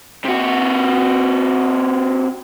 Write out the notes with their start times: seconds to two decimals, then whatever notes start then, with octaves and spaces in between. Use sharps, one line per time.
0.25 C3 F#4